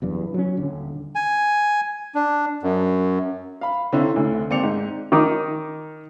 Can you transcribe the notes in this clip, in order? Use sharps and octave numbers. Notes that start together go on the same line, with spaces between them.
F#1 E2 G2
F#3 C#4
D#1 D3
G#5
D4
F#2
F5 B5
D3 C4 C#4 D#4 E4
D2 D3
D#2 C4 D5 C#7 F7
G#2
D#3 D#4 D6